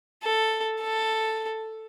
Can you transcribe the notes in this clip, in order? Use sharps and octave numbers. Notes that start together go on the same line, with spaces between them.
A4
A4